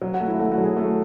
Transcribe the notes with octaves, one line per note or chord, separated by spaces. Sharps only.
F#3
F#4
A3
E4
A3 F#4
F#4
F#3
G#4
A3